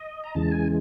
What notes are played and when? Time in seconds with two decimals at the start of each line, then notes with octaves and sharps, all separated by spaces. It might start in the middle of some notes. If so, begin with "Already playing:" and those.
Already playing: D#5
0.24 A#5
0.35 E2 C#3 E3 G#3 A5
0.51 G#5